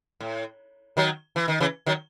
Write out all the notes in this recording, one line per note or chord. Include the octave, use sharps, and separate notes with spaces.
A2
D#3 F#3
E3
D#3
C#3 E3
D#3 F#3